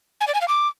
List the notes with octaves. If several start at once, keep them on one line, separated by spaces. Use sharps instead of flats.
G#5
D5
G#5
F5
D6